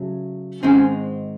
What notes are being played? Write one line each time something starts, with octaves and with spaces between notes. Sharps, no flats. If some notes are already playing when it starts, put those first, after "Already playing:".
Already playing: C#3 F#3 A3
G#2 D#3 G#3 C4 C#4 D#4